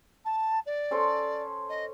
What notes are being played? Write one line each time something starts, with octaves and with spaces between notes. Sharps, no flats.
A5
D5
C#4 A4 C5
D#5